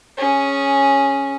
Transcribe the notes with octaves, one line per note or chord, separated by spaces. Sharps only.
C#4 G#4